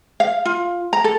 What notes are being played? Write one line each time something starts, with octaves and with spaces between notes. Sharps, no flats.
F5
F4
A#5
A4